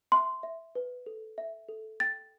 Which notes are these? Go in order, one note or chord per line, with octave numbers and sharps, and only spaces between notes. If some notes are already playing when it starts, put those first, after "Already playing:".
E5 C6
E5
B4
A4
E5
A4
G5 A6